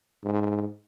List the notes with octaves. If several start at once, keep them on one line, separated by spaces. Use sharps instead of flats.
G#2